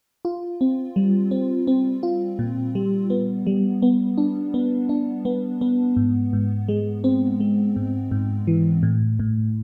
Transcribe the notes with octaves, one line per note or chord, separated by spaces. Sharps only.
F4
C4
G3
C4
C4
F4
A#2
G3
B3
G3
B3
D4
B3
D4
B3
B3
G#2
G#2
G#3
C4
G#3
G#2
G#2
E3
A2
A2